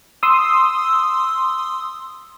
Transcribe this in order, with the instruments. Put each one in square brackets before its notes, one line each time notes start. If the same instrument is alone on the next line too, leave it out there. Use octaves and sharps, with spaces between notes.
[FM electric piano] C6 D#6 E6